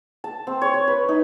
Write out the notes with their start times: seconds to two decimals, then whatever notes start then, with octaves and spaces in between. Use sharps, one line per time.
0.24 A5
0.47 C4
0.62 C#5
0.74 C#5
0.88 B4
1.09 D#4